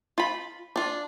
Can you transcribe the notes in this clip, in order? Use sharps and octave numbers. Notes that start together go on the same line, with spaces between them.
F4 B5
D4 F4